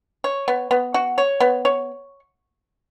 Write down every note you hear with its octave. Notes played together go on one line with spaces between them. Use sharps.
C#5
B3
B3
F#4
C#5
B3
C#5